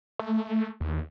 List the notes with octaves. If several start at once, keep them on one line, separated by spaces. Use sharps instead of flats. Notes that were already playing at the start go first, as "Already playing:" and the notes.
A3
D#2